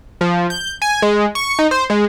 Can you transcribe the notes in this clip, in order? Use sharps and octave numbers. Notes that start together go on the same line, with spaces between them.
F3
G6
G#5
G#3
C#6
D#4
C5
G#3